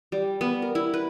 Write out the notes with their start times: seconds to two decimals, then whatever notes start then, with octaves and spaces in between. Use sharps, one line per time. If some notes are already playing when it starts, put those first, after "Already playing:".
0.12 G3
0.41 B3
0.62 A#4
0.75 E4
0.94 B4